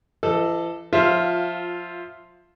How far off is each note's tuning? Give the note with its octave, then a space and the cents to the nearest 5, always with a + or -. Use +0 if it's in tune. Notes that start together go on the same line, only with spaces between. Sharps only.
E3 +45 A4 +0 D#5 +0
F3 +15 F4 +0 E5 +0